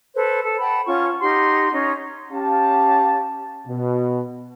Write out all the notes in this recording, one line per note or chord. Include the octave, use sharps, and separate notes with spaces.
A4 B4 C5
A4
F#5 G5 A5 B5
C#4 F4 F#5 C#6
D#4 G4 F#5 C6
C#4 D#4
C#4 G4 F5 A5
B2